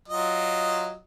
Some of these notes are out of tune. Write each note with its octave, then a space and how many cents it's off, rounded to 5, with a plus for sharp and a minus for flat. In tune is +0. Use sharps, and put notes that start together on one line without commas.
F#3 +0 F4 +0 D#5 +0